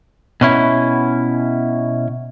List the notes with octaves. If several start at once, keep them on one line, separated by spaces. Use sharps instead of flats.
B2 C#4 E4